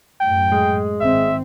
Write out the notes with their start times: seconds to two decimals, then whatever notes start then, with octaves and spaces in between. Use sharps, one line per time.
0.21 F#2 A2 G5
0.52 G#3
1.01 G#1 C4 E5